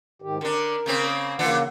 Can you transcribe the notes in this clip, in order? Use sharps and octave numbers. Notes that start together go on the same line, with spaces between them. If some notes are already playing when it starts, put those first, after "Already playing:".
G#2 D#3 G4
D3 D4 A#4
C#3 A#3 C4
C#3 E3 A#3 D4 F4 F#5